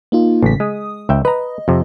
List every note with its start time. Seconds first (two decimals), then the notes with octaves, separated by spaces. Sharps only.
0.12 A#3 D#4 F4
0.42 A1 C#3 B6
0.60 G#3 D#6
1.09 C#2 E5 G5
1.25 B4 D#5 A#5
1.68 F2 C3